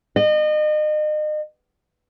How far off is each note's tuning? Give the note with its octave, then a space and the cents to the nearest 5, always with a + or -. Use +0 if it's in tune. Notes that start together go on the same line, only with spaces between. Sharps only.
D#5 -35